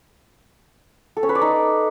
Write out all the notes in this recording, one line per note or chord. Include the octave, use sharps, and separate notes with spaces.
A4
C#4
B4
D5
D#4